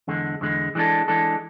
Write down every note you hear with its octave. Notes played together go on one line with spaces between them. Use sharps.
E2 D3 G#3
E2 D3 G#3
E3 G#3 D4 A4
E3 G#3 D4 A4